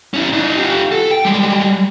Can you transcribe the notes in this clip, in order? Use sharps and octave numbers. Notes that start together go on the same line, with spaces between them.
C#4 E4
D4 D#4
F4 G4
A4
G5
G3 G#3